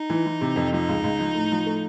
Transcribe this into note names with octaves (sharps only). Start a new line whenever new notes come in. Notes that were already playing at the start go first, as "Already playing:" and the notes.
Already playing: D#4
E3
E3
C3
F2
F3 D#4
C#2
C#2
F3
A2
F3
A3